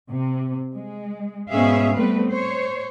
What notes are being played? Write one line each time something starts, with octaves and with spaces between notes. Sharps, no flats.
C3
G#3
G#2 B2 C#4 G#4 E5 F5
G3 A3 B3 C4 B4
C5 C#5